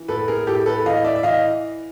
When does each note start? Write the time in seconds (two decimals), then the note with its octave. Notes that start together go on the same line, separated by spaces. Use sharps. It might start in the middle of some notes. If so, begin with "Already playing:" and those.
Already playing: E3
0.08 A2 A4 B4
0.28 G#4 A#4
0.47 A2 G4 A4
0.66 A4 B4
0.86 E3 D#5 F5
1.04 D5 E5
1.16 E5
1.23 E3 D#5 F5